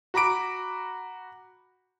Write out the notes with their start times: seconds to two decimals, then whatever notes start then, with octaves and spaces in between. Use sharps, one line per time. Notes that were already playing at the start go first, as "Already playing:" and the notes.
0.14 F#4 A#5 B5 D6 D7